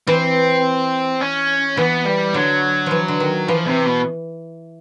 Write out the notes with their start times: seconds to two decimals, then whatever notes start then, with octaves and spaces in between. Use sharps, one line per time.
0.07 E3 C4
1.21 C#4
1.77 E3 B3
2.06 G3
2.34 D3 F#3
2.86 E3 F3
3.08 D3
3.20 D#3
3.48 E3 F3
3.67 C3
3.86 B2